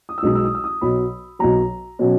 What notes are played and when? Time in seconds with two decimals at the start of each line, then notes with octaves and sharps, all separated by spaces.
0.09 D#6
0.18 E6
0.23 B1 B2 G#3 D#4 D#6
0.35 E6
0.45 D#6
0.55 E6
0.64 D#6
0.81 B1 B2 F#3 B5
1.39 B1 B2 F#3 A#5
1.99 B2 F#3 C#4